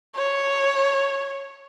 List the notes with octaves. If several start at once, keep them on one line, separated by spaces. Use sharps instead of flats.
C#5